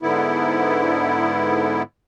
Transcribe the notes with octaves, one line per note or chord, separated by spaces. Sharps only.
G#2 D3 B3 E4